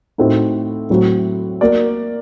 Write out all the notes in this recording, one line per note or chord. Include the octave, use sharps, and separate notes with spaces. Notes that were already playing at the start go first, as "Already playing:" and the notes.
A2 A3 C4 D#4 F#4
A2 F#3 C4 F#4
A#3 F#4 A#4 D5